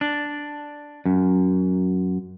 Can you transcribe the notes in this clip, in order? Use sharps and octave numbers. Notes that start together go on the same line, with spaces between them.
D4
F#2